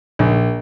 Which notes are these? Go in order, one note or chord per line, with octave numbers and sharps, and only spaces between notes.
A#1